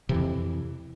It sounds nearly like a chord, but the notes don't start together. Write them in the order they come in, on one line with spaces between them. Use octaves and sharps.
C3 E3 F2